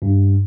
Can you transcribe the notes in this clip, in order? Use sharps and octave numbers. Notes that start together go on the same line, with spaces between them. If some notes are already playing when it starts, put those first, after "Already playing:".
G2